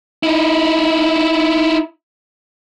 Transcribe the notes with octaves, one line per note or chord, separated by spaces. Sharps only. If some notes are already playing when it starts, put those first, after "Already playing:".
D#4 E4